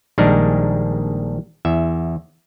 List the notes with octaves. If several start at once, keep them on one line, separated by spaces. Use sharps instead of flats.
A#1 D#3 G3 G#3 D4 A#4
E2 E5